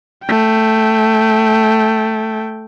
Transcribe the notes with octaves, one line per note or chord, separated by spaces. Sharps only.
A3 G5